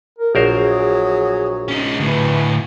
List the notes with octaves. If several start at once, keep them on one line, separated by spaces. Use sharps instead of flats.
A#4
A#1 F#3 G#4 A#4 C5
C#4 D#4
D2 A2 B4